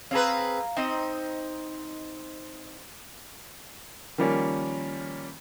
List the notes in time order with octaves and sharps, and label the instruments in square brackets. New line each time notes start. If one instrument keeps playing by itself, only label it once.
[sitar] C4 G#4 B4 [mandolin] F5 A#5
[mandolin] C4 D#5 [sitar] D#4
[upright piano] D#3 F3 G3 A#3 C#4